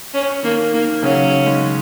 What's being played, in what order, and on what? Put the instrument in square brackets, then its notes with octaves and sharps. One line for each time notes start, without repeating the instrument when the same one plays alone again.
[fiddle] C#4
[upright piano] D#3 [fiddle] A#3
[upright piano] D#3 [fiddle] A#3
[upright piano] C#3 F#3 [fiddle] C#4
[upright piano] D#3 G#3